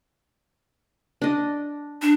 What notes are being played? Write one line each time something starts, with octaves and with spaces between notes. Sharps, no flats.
D4 D#5
D4